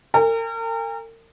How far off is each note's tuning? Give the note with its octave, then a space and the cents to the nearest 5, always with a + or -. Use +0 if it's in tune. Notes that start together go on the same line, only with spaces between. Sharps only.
A#4 -40 G#5 -45